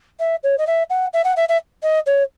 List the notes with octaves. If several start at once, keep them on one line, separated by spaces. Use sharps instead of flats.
E5
C#5
D#5
E5
F#5
E5
F#5
E5
E5
D#5
C#5